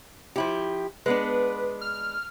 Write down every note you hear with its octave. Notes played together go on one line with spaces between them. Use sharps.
F3 E4 G4
G#3 B3 D4 B4
F6